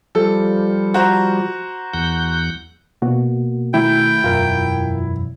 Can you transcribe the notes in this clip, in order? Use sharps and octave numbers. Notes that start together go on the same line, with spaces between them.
F3 G3 A4
F#4 C5 A#5
E2 F#5 G6
B2 A#3 F#4
D#3 A3 E4 G5
E1 F#2 F4 A#4